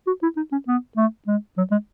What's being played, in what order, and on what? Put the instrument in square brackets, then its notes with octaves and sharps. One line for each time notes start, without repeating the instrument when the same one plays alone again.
[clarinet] F#4
E4
D#4
C#4
B3
A3
G#3
F#3
G#3